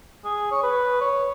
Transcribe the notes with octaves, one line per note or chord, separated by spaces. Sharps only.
G#4
C#5
B4
C#5